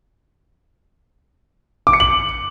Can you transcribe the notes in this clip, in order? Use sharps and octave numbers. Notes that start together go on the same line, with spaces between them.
D6
C#7
F#7